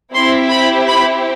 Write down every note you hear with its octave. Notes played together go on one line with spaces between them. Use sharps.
C4 E4 G4 C6
B5
B5